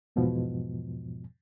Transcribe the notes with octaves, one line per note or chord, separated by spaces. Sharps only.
E2 G#2 B2 F3